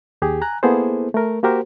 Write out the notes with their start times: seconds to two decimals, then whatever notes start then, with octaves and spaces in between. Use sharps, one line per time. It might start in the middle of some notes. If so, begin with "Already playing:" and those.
0.22 D#2 G4 G#4
0.41 G#5 A#5 F#6
0.63 A#3 B3 E4 G#4 A4 C5
1.14 A3 A#4
1.43 A#3 F#4 G4 A#4 C5